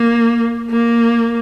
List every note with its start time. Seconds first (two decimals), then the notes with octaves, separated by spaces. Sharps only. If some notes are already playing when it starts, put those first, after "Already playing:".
Already playing: A#3
0.70 A#3